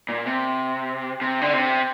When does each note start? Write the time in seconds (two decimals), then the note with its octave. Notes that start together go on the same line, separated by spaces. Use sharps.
0.09 A#2
0.26 C3
1.21 C3
1.41 D3
1.53 C3